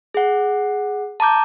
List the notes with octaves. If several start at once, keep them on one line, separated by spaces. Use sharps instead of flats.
G#4 F#5
A5 A#5 D6 G6